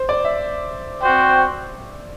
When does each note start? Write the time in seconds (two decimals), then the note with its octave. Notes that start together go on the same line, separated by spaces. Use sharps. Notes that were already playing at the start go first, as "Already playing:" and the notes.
Already playing: C5
0.09 D5
0.25 E5
1.02 C4 F#4 C5 G5